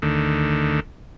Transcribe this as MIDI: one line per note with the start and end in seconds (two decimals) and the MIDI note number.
0.02 0.80 38
0.02 0.80 50
0.02 0.80 51
0.02 0.80 57